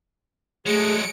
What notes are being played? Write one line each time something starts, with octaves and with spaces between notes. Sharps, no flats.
F#3 G#3 A3 G#4 C#7 D7